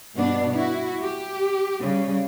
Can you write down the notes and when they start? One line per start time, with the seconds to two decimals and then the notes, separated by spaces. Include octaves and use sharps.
0.16 G2 B2 B3 D4
0.55 E4 F#4
1.02 G4
1.81 C#3 G3